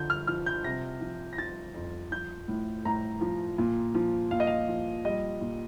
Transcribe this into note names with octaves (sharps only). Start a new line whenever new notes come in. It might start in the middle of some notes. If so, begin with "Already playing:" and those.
Already playing: D3 F3 G6
F6
F3 F6
G6
C3 A#6
F3
A#6
F3 A6
F2
F3 G6
A2
A2 A#5
F3
A#2
F3
A#2 F5
D#5
F5
F3
G3 D#5
A#2